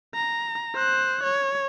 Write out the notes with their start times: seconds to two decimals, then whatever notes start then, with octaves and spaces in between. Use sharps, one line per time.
0.15 A#5
0.75 C5 F#6
1.23 C#5